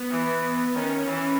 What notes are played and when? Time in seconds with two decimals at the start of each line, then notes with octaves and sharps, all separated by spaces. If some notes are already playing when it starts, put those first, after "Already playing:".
Already playing: B3
0.11 E3
0.75 D#3 C#4
1.06 E3